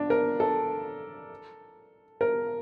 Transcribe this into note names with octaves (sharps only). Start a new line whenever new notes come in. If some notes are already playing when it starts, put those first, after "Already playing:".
Already playing: D4
A#4
A4
A#4